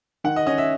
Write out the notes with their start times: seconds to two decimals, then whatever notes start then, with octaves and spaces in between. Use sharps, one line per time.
0.24 D#3 F#5
0.36 D#5
0.47 C#4 D#5
0.58 E5